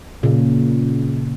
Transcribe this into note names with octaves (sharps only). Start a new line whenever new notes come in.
A#2 C#3